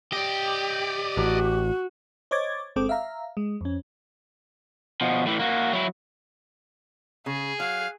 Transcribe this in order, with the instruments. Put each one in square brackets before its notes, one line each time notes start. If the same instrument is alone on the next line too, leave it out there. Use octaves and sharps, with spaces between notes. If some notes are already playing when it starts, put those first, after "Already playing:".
[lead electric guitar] G4 [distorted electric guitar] D5 D#5
[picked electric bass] A1 [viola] F#4
[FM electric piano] C5 C#5 D#5 D6 G#6 A6
G1 G#3 C4 A4 D6
E5 F5 A#5
G#3
F2 C#4
[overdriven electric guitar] B2 F3
A2 E3
A#3 F#4
F#3 E4
[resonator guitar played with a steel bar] C#3 [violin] G#4
[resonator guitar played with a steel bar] F#3 [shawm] F5